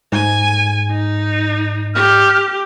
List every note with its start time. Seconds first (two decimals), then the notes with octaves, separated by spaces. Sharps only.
0.12 G#2 G#5
0.91 D#4
1.95 G4 F6